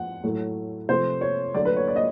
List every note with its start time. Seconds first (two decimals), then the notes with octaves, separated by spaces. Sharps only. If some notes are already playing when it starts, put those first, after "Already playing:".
Already playing: F3 F#5
0.23 A2 F#3 A3
0.89 C3 F3 A3 C5
1.21 C#5
1.54 D3 F#3 A3 D5
1.65 B4
1.76 C#5
1.88 D5
1.96 D#5